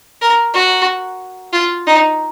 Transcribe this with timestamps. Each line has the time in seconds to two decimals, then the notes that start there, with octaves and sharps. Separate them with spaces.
0.21 A#4
0.54 F#4
1.53 F4
1.87 D#4